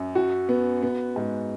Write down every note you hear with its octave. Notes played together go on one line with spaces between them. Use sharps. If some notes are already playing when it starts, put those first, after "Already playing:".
Already playing: F#2
F#4
B3
B3
G#2